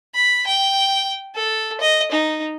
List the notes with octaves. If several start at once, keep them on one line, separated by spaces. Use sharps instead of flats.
B5
G5
A4
D#5
D#4